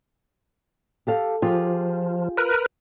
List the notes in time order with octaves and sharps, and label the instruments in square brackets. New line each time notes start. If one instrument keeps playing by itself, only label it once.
[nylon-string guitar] G4 A4 F5
[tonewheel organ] F3 [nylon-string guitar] F4 G4 G#4
[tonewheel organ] A#4 B4